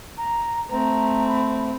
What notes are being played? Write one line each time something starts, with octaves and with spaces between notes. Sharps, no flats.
A#5
A3 C4 A#5
B5